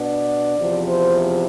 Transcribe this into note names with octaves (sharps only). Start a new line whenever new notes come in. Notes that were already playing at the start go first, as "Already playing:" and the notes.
Already playing: B2 B3 D4 D5
E2 C3 F3
C5